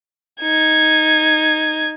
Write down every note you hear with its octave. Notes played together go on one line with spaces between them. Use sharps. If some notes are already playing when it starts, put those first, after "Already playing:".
D#4 G#6